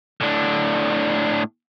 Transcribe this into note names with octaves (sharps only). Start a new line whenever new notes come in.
A2 D4